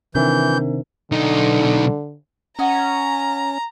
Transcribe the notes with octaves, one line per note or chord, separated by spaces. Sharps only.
C3 D#3 E3 C4 D4 A#4 G6
B1 D3 D#4
C#4 F#4 D#5 G#5 A#5